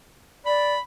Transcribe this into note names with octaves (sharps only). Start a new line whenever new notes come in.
D5 B5